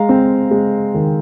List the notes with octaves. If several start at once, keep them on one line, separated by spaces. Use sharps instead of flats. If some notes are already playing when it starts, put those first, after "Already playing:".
Already playing: G#3 F5 A#5
C4
G#3
D#3